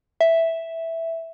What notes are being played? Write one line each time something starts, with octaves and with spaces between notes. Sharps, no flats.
E5